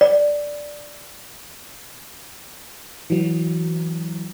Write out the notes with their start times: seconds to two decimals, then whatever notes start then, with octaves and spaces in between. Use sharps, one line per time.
0.01 D5
3.10 E3 F#3